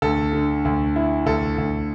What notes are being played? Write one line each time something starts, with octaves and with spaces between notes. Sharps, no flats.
D2 A4
D3
D2
E4
D2 A4
D2